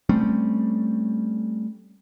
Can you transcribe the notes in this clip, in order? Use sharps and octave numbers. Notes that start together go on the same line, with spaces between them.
G3 A3 C4 C#4